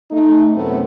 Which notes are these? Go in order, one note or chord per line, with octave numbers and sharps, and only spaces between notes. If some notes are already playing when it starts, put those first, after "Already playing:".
A3 D#4
F#2 A2 C3 A3 B3 C4